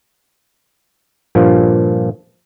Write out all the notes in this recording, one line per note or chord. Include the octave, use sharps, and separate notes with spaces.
G2 A#2 F3